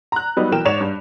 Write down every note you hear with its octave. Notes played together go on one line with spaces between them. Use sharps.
A#5 F#6
F#3 G3 B3 D#4
B1 E3 A#4 G5 E7
G#2 C#5 D5 E7 F7
G2